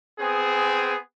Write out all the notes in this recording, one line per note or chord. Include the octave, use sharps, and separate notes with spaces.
B3 C4 G#4